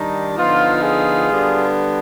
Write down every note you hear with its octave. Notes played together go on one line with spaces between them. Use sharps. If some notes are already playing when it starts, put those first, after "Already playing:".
Already playing: D#3 G3 D4 D#4
D3 F3 B3 D#4 F4
F4 G#4
D3 G3 B3 D4